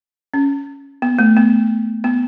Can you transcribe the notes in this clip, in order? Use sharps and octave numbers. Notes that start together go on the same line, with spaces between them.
C#4
B3
A3
B3
B3